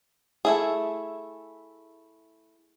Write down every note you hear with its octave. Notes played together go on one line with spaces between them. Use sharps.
A3 E4 G#4